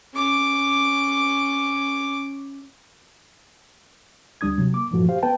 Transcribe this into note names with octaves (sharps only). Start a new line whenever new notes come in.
C#4 D6
D2 G3 D4 D#6 G#6
C3 F#3
A#3 D6
G2 A#2 E3 F3 A3 F#4
G4 C5 F5
B3 B4 G5 A5